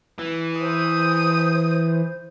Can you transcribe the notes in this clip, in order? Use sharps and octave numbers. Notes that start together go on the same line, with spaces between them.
E3
C5 D#6